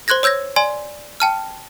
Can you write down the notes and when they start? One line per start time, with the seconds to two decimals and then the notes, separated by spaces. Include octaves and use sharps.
0.08 C5 C6 F#6 G#6 A#6
0.23 C#5 E6 G6 G#6 A#6
0.56 D5 G#5 C6
1.20 G5 A5 F6